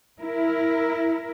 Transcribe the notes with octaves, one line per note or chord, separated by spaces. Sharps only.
E4 A#4